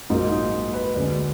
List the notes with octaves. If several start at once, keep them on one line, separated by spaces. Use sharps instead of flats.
A#1 G#2 F#3 A#3 D#4
D#4
B4
D2 D3 G#3 D5